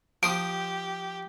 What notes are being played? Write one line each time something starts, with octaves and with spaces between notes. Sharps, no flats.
F3 G4 C6 D#6 D7